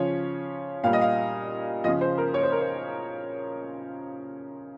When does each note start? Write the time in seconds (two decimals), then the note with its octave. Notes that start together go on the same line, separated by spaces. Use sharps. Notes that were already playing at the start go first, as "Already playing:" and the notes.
Already playing: C#3 F3 C#5
0.84 A#2 G3 F5
0.93 D#5
1.01 F5
1.84 C#3 F3 D#5
2.01 C5
2.18 A#4
2.34 C#5
2.43 C5
2.52 A#4
2.60 C5